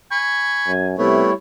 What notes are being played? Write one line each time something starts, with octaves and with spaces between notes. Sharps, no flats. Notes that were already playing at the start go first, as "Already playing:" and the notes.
G#5 B5 C#6
F#2
C3 G3 A3 B3 E4 C#5